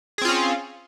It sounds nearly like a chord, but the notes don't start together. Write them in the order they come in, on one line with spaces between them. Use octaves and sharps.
G#4 C4 F4 C#4